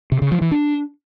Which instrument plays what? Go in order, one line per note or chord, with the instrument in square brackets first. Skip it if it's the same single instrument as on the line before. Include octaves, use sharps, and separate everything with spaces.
[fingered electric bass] C3
C#3
F3
E3
D4